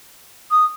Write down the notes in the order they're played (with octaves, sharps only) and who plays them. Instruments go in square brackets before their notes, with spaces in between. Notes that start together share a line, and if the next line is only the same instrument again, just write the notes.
[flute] D#6